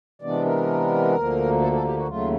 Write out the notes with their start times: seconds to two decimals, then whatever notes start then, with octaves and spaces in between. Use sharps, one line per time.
0.22 C3 E3 G#3 B3 D4 D5
0.45 A#4
1.16 D2 D3 F3 A#3
1.62 A4
1.73 A4
1.84 G4
1.97 F#4
2.08 D#2 C#3 F#3 A3 F4